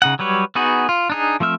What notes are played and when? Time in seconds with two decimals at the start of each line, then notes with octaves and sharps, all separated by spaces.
0.02 C#3 D#4 F#5
0.19 F#3 G3 B4 C#5
0.55 B3 D#4 F#4 G#4 B4
0.89 F4
1.10 D4 D#4 G#4
1.40 F3 A3 C4 E5 F6